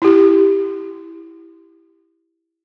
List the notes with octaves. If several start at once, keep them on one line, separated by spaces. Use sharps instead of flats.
E4 G4